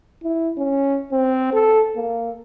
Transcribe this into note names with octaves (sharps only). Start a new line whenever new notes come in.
E4
C#4
C4
A4
A#3